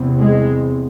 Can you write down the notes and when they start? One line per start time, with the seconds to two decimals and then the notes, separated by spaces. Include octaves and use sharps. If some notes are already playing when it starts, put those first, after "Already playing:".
Already playing: E2 C3
0.19 G#3